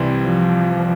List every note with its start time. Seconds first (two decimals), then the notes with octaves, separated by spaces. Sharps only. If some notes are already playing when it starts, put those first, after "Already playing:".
Already playing: C2 C3 E3 G3 C4
0.20 F3